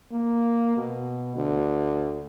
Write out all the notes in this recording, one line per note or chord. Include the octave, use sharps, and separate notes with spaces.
A#3
B2
D2